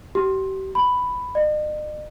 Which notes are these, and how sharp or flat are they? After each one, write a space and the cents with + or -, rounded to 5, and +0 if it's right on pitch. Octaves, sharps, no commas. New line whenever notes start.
G4 -35
B5 +5
D#5 -45